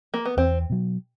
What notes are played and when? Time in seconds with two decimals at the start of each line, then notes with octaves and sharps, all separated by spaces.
0.14 A#3
0.25 B3
0.37 E2 C4
0.70 B2 F#3